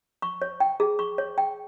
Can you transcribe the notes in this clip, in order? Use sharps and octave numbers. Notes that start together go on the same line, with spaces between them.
C#6
C#5
G5
G#4
C#6
C#5
G5